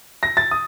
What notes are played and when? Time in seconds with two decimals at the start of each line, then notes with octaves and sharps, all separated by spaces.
0.23 A#6
0.37 A6
0.51 D#6